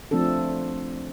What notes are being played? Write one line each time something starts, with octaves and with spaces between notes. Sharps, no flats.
F3 A3 C4 D4 A4